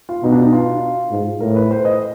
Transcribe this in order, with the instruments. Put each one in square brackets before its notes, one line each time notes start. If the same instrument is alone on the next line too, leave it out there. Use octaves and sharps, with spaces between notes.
[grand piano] F4
[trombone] B2 [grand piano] D#4
[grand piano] D4
D#4
F4
[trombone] G#2
[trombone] A2 [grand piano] A#4
[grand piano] B4
C5
D#5